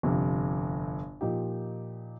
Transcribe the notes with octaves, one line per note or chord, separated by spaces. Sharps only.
G1 F2 C3
A#2 F3 D#4 G4